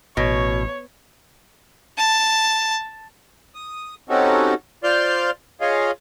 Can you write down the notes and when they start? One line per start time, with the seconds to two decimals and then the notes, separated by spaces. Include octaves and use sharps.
0.17 A1 B2 C#5
1.97 A5
3.55 D#6
4.09 C4 C#4 D#4 F#4 G4 A4
4.84 F4 C5 D5 C6 F6 G6
5.61 F4 G#4 C#5 D#5 F5